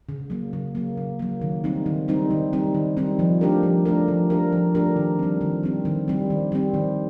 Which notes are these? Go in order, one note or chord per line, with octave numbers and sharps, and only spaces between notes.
C#3
F#3 A#3
C#3
F#3 A#3
C#3
F#3 A#3
D#3
G3 C4 D#4
D#3
G3 C4 D#4
D#3
G3 C4 D#4
D#3
G3 C4 D#4
F3
A3 D4 G4 A#4
F3
A3 D4 G4 A#4
F3
A3 D4 G4 A#4
F3
A3 D4 G4 A#4
D#3
G3 C4
D#3
G3 C4
D#3
G3 C4
D#3
G3 C4
D#3